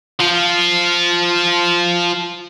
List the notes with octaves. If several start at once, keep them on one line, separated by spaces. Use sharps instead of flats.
F3 F4